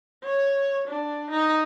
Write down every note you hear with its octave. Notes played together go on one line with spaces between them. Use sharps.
C#5
D4
D#4